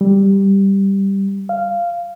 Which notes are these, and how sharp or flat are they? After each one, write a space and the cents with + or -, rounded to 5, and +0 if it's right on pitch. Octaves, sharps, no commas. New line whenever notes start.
G3 +0
F5 -10